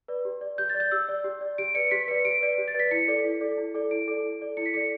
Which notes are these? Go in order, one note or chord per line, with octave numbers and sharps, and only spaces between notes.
B4 D5
G4
D5
G4 G6
A6
D5
G6
G4 E6
D5
G4
D5
G4 D7
B4 D5 C#7
G4 B6
B4 D5 C#7
G4 D7
B4 D5
G4
A6
B4 D5 B6
E4 C#7
A4 D5
E4
A4 D5
E4
A4 D5
E4 D7
A4 D5
E4
A4 D5
E4 C#7
B6
A4 D5 C#7